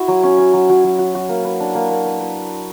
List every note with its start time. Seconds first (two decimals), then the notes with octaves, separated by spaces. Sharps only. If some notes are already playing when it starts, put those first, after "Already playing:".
Already playing: E4 F#4 E5
0.08 F#3
0.23 C#4
0.38 C#4
0.54 F#3
0.69 F#3
0.84 F#3
0.99 F#4
1.15 F#4
1.29 A#3
1.45 B4
1.60 D4
1.75 A#3
1.90 A#3
2.05 B4
2.20 B4